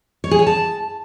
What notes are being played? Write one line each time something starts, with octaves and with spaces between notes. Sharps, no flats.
C#5
G#4
C#5
A5